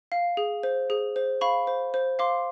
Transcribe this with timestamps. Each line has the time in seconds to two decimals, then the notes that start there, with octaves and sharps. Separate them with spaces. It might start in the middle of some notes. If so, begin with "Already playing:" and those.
0.12 F5
0.37 G#4
0.63 C5
0.90 G#4
1.16 C5
1.41 F5 B5 C#6
1.67 C5
1.94 C5
2.19 F5 C6 D6